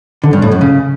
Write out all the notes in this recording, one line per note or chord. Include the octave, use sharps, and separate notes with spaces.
D3
G2
A2
F#2
C#3